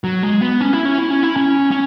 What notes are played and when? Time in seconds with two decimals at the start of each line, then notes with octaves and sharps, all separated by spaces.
0.04 F#3
0.23 G#3
0.41 B3
0.61 C#4
0.73 E4
0.85 C#4
0.98 E4
1.11 C#4
1.23 E4
1.37 C#4
1.71 C#4